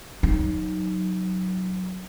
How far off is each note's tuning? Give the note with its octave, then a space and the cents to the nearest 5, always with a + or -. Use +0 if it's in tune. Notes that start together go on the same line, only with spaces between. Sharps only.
F#3 +0 D#4 +0